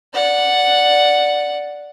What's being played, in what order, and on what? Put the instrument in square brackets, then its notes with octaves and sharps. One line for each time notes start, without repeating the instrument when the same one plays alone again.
[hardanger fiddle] D5 F#5